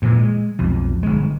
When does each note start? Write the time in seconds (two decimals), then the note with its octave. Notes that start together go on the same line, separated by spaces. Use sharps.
0.02 G2 A#2 E3
0.18 G#3
0.59 B1 F2
1.03 G1 G#3